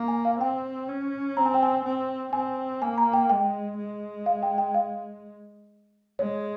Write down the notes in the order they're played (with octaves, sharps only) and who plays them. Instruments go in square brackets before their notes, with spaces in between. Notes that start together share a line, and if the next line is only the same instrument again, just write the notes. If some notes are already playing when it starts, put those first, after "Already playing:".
Already playing: [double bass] A#3
[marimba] G#5
F5
[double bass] C4 [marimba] G5
[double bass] C#4
[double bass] C4 [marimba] A#5
[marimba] G#5
G5
G#5
[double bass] C4
[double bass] C4 [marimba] G#5
[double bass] A#3 [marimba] G#5
[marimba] A#5
G5
[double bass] G#3 [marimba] G5
[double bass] G#3
[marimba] F5
G5
G5
F5
[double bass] G#3 [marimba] C#5